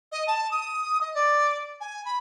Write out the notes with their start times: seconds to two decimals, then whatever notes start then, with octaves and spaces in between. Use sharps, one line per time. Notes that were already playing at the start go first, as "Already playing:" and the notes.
0.12 D#5
0.27 A5
0.51 D#6
1.01 D#5
1.14 D5
1.81 G#5
2.05 B5